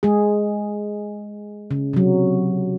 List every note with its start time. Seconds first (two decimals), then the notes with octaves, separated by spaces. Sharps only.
0.03 G#3 G#4
1.71 C#3
1.93 C3 F#3